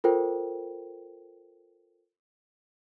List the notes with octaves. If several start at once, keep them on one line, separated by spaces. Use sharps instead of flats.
F4 A4 A#4 C5 G5